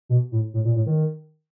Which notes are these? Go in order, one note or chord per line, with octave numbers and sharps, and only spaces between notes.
B2
A2
A2
A#2
A2
D#3